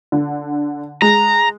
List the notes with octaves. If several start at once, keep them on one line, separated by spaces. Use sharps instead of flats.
D3
G#3 A#5